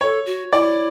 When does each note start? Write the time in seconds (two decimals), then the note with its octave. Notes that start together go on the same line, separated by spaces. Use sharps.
0.01 A4 C#5
0.26 F#4
0.52 E4 D5